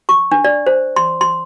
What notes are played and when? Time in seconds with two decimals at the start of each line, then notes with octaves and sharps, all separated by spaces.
0.09 C#6
0.32 D4
0.45 D5
0.67 C5
0.96 C6
1.21 C6